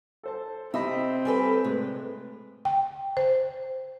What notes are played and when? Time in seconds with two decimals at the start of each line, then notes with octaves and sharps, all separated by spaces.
0.23 A4 C5 A5
0.74 C3 C4 D#5 E5 B5
1.25 G3 A4 B4 G#5
1.64 A2 C3 G#3 B4
2.65 G5
3.17 C5